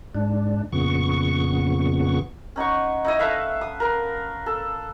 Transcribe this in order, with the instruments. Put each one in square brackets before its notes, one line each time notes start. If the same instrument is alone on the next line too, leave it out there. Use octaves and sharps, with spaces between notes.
[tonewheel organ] G#2 D4
F2 A#2 C#3 B3 C#6
[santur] C#4 D#4 F#5 C#6
D#4 E4 D#5
A4 B4 E5 F5
D#6
A#4 B4
A4